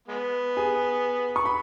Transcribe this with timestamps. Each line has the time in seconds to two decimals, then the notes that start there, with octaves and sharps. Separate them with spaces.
0.08 G#3 B3
0.57 G#4 G#5
1.36 C#6
1.45 B5